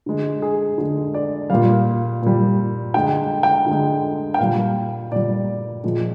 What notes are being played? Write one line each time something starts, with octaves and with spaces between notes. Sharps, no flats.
D3 G#3
G#4
D3 G#3
D5
A#2 G3 F5
A#2 G3
D3 G#3 G5
G5
D3 G#3
G5
A#2 G3 F5
A#2 G3 D5
A#2 F3 G#3